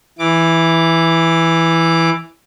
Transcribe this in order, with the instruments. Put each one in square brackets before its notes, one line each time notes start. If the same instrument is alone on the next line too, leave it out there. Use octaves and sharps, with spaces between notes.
[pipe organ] E3 D6